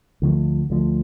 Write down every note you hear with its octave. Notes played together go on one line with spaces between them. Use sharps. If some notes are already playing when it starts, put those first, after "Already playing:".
D2 D3 F3 A3
D2 D3 F3 A3